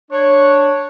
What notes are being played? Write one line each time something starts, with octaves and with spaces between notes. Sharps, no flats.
D4 C#5